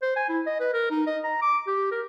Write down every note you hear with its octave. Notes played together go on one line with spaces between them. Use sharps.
C5
G#5
E4
D#5
B4
A#4
D#4
D#5
A#5
D6
G4
A#4